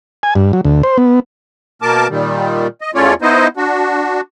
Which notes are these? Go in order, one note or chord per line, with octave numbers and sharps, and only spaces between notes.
G#5
G2
F#3
D2
C5
B3
B2 A#3 A#4 A5 D6
A#2 D#3 G3
D#5
E2 A3 C#4 F4 C#5 D5
B3 D#4 E4 C5 D#5
D4 F#4